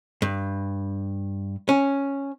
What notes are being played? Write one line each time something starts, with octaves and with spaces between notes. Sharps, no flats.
G2
C#4